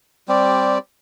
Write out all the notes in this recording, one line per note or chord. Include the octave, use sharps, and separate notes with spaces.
G3 C4 G4 D5